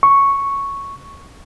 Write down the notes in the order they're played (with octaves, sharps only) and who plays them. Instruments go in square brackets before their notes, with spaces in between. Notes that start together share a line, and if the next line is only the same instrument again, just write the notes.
[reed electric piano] C#6